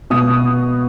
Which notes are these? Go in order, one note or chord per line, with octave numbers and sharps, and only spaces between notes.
B2 D#6